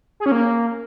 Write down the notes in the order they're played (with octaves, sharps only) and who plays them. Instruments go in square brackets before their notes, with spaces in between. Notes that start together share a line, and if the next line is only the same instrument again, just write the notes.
[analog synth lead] G#4
C#4
A#3